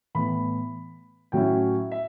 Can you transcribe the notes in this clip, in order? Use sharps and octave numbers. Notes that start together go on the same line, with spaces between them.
A2 E3 B3 B5
A2 F#3 C#4 E4 G5
E5